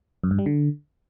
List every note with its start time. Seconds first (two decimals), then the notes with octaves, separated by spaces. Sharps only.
0.24 F#2
0.31 G2
0.39 G3
0.46 D3